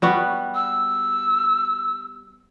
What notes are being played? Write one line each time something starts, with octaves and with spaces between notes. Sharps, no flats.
G3 B3 F#4
E6